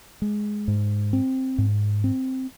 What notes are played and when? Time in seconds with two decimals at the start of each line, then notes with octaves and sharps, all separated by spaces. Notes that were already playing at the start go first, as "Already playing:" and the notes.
0.22 G#3
0.68 G#2
1.13 C4
1.58 G#2
2.04 C4